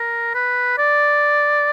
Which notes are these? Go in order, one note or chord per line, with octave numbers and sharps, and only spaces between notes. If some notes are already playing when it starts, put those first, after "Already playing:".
Already playing: A#4
B4
D5